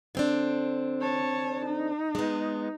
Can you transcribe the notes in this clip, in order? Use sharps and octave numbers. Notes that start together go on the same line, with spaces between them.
D3 C4 D4
C#5 A5
D#4
G#3 B3